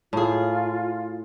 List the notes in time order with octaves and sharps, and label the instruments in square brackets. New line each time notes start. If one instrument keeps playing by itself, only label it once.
[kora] A2 G#4 [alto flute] F4